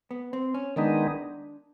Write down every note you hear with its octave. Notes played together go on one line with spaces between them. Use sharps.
B3
C4
C#4
D#3 G#3 B3 D4 D#4